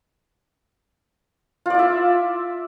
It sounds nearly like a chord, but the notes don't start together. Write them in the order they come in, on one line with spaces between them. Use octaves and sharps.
F4 D5 E4 E5